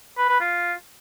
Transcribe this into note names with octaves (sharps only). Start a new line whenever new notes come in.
B4
B4
F4